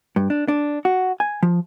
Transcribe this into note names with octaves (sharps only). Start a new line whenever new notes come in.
G2
D4
D4
F#4
G#5
F3